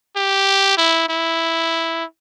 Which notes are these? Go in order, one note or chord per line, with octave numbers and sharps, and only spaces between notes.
G4
E4
E4